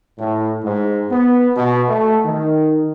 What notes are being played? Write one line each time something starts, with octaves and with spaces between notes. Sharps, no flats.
A2
G#2
B3
B2
A3
D#3